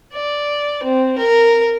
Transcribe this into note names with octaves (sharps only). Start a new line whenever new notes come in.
D5
C4
A#4